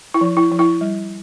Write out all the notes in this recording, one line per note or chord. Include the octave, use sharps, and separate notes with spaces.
E4
F3
E4
F3
E4
G3